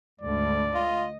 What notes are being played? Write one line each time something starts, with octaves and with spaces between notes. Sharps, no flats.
D2 G#2 D5
F4 D#5